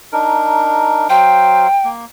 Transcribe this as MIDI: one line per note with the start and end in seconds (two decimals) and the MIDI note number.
0.13 1.08 62
0.13 1.08 63
0.13 1.08 70
1.09 1.67 54
1.09 1.67 72
1.09 1.67 77
1.09 1.88 79
1.84 2.05 58